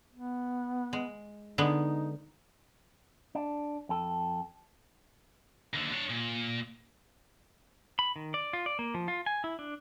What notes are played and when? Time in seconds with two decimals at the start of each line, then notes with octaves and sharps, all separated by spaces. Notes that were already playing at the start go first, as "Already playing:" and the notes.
0.13 B3
0.93 G#3
1.58 D3 G#3 B3 D#4
3.35 D4
3.89 F2 A4
5.74 D#2 D3
5.92 D4 C#5
6.09 A#2
7.99 B5
8.16 D#3
8.34 D5
8.53 F4
8.66 D5
8.79 A#3
8.94 F3
9.08 F4
9.26 G#5
9.44 E4
9.59 D4